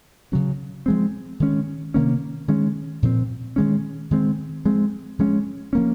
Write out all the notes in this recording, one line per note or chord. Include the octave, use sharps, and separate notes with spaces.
C#3 F#3 C#4
F3 G#3 C4
D#3 G#3 C#4
C3 D#3 A#3 C#4
D#3 G#3 C#4
A#2 F3 C4
D#3 G#3 C#4
D#3 G#3 C4
F3 G#3 C4
F3 G#3 C#4
F3 A#3 C#4